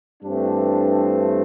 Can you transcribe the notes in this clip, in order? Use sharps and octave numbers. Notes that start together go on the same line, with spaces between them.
G2 E3 A3 C4 D4